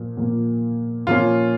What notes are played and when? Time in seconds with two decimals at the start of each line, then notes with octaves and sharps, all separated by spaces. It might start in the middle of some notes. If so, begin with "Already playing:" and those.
Already playing: A#2 F3 A#3
0.17 A#2 F3 A#3
1.07 A#2 F3 A#3 C#4 F4